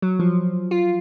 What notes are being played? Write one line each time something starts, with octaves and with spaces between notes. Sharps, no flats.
F#3
F3
F4